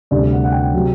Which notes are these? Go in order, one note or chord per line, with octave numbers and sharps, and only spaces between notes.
D2 C3 G3 D5
F#5
F#5
G5
C3 F#3